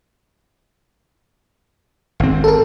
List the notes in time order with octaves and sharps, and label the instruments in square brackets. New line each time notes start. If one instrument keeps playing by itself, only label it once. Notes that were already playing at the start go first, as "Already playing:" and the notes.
[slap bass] G#1 C4
[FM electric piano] A4 A#4